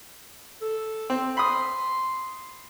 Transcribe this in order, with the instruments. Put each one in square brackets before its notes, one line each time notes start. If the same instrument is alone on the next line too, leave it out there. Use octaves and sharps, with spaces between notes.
[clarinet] A4
[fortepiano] C4
[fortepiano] B5 D#6 [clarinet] C6